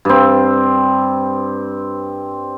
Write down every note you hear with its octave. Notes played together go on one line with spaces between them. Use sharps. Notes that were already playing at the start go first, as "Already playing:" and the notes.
G2 C4